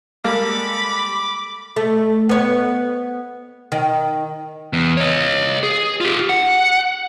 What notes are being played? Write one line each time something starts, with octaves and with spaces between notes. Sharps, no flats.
G3 G#3 A#3 A4 B5 D6
A3
B3 C#5
D#3
E2
C#5 D#5
G#4
F4 G4
F#5